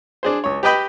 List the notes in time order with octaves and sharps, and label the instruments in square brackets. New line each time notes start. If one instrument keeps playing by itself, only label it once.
[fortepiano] D4 G#4 C5
C#2 C#5
G4 B4 D#5 G5 B5